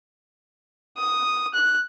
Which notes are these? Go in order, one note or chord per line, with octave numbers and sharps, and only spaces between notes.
D#6
F#6